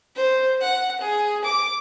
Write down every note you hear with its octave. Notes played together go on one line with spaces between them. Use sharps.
C5
F#5
G#4
D6